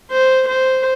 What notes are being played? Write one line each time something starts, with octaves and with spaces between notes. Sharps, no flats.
C5
C5